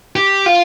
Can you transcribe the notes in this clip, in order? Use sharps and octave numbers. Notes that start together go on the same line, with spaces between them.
G4
F4